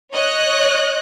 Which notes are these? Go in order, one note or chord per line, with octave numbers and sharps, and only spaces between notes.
C#5 D#5 F#6